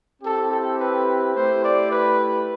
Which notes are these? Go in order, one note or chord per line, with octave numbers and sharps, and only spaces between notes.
C4 E4 G4 A4
A4
B4
A3 E4 G4 C5
D5
B4